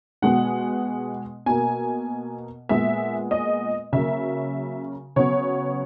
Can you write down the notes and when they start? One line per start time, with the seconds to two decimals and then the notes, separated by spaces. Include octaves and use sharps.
0.22 B2 G#3 B3 F#5
1.46 B2 A#3 G#5
2.69 A#2 G#3 B3 E5
3.31 D#5
3.93 C#3 F#3 A#3 E5
5.16 C#3 F#3 B3 C#5